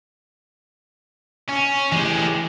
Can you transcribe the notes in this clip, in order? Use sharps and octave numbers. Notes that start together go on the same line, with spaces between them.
C#4
E3 G#3 A3 G4